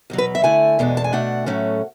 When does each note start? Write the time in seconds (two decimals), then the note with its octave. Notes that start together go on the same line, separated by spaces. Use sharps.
0.10 E2 B2 F#3
0.18 B4
0.35 E5
0.43 D3 A3 E4 G#5
0.79 E2 B2 G#3 D4
0.97 A5
1.04 G#5
1.13 B2 A3 D4 F#5
1.46 A2 F#3 A3 C#4